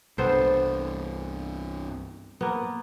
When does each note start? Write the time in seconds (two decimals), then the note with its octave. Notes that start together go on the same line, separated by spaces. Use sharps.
0.18 C2 G2 B3 A4 C5
2.41 A#3 B3